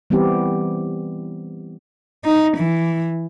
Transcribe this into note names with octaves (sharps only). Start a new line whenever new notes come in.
E3 G3 B3 C4 E4 G4
D#4
E3